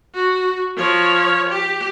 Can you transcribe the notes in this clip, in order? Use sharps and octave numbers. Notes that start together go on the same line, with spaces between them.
F#4
F3 C#5
G4